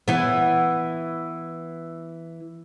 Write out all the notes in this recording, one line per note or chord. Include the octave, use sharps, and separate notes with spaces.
E3 B3